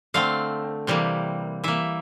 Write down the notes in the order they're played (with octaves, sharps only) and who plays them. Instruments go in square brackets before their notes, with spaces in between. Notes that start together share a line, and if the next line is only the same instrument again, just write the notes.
[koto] D3 A3 C4 F5
C3 E3 G3 A#3
E3 A#3 E5